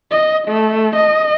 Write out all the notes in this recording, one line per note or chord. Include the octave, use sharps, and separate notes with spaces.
D#5
A3
D#5